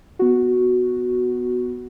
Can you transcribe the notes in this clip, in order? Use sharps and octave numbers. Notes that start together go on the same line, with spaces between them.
B3 F#4